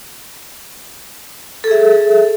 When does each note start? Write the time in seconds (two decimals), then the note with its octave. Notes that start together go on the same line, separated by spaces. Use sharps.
1.64 A4
1.68 G#4
1.71 E5